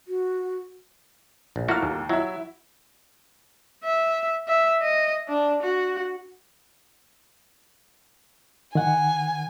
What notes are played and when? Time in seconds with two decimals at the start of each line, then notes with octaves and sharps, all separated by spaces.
0.08 F#4
1.56 A#1
1.68 A3 A#3 E4 F#4 F6
1.82 D#2
2.09 F#3 E4 E5
3.84 E5
4.48 E5
4.82 D#5
5.28 D4
5.63 F#4
8.75 D#3 F#5 G#5